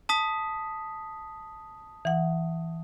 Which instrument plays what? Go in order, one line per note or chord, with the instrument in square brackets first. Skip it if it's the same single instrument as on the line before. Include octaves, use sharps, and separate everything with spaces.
[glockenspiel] A5 D#6 B6
[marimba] E3 F#5